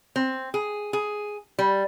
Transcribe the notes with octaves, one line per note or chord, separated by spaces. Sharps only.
C4
G#4
G#4
G3